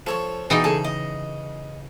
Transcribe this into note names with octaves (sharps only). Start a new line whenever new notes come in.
F3 A4 C#5 C#6
B2 E3 D#4 G#4 D5 D#5 G5
C#3 G#4 A4
D#5